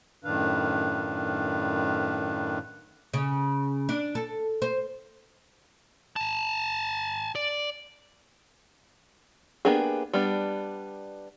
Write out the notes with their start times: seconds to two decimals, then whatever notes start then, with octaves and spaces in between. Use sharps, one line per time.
0.24 F#2 A2 D#3 D4 B4 F5
3.14 C#3
3.89 D4
4.15 A4
4.62 C5
6.16 G#5 A5
7.35 D5
9.65 A#3 B3 D4 G4 G#4
10.13 G3 B3 D4